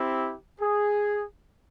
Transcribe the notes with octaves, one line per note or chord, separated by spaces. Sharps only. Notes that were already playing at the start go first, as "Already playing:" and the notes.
Already playing: C4 E4 G4
G#4